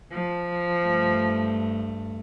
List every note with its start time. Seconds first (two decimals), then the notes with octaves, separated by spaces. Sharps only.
0.11 F3
0.86 G2 A3